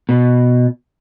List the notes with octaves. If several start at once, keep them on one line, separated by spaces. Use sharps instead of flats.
B2